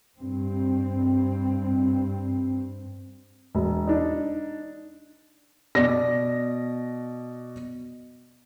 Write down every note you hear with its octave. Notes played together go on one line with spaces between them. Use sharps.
G2 C4
E1
D4 D#4
B2 D5 A#6